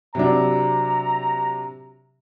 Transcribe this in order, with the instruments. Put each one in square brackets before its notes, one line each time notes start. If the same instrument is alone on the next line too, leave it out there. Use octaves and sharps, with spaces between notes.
[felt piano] C3 F#3 D4 [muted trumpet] A#5